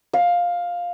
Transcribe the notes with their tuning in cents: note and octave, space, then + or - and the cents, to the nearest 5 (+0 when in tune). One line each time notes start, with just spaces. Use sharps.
F5 +10